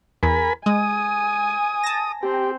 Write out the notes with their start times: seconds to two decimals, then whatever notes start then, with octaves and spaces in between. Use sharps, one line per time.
0.23 E2 A#4 G#5 B5
0.66 G#3 G#5 D#6
1.83 A5 A#6
2.23 C4 G4